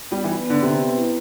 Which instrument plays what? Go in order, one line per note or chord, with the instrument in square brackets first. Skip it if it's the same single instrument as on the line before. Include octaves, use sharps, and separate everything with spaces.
[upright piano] G3 [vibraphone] B3
[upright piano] E3 [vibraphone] B4
[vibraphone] B3
[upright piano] D3
[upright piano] C3 [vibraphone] B4
[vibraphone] B3
E4